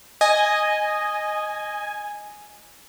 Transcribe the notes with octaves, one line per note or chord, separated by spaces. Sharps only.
D#5 G#5